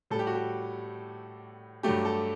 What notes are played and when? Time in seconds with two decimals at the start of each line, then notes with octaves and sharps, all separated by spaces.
0.10 A2 A4
0.15 G3 G4
0.27 F#4
0.35 G4
1.83 G2 F#3 A3 G4
2.05 A4